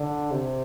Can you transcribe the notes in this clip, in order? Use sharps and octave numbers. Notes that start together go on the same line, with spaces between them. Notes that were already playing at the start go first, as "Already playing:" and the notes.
Already playing: D3
C3